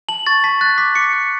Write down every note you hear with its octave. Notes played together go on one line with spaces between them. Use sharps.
A5 F#7
C#6 A6
A5 B6
F#6 A6
D6 B6
D6 C#7
F#6